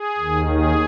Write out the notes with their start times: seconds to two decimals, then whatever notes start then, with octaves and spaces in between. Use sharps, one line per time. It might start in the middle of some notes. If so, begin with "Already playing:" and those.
Already playing: G#4
0.18 D#2 D#3
0.47 G#4